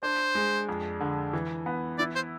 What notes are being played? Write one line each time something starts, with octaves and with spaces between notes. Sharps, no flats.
D4 C5
G#3
F2
D3
E3
B3
E4 D5
C5